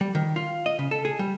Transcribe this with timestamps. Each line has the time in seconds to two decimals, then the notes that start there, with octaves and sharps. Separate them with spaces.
0.01 G3
0.15 D#3
0.36 F4
0.66 D#5
0.79 C#3
0.91 A4
1.05 G#4
1.19 G3